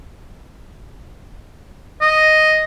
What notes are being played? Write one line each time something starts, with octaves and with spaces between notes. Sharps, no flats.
D#5